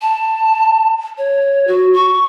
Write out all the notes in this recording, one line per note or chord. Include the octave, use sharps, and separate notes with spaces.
A5
C#5
F#4
C#6